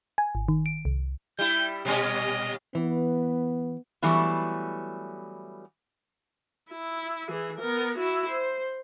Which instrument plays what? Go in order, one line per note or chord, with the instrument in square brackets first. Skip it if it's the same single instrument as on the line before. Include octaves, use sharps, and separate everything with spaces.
[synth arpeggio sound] G#5
G#1
D#3
D7
C2
[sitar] G3 E4 [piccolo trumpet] G6
[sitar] A#2 G3 C#4 [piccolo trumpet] D#5
[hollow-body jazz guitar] E3 [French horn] B3
[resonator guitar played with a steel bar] E3 F#3 G3 A3 B3
[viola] E4
E3 G#4
B3 A#4
E4 F#4
C5